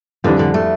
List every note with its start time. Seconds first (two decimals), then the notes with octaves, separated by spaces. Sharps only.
0.24 F2 D3 E3 G3 D4
0.39 D3
0.54 A3